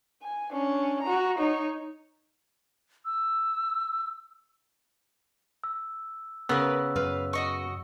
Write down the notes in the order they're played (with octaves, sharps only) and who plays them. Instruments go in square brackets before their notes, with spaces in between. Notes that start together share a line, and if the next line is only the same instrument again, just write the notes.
[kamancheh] G#5
C#4 D4
F#4 A#5
D#4 C#5
[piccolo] E6
[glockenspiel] E6
[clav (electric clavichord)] C#3 B3 [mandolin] A#4 B4 [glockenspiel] E6
[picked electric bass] F#2 [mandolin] B4 F5
[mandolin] F#4 D#5 C#6